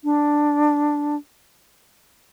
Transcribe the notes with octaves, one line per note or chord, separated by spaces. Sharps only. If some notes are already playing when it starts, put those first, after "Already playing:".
D4